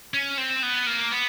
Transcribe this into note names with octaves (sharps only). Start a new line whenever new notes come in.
C#4
C4
B3
A#3
B3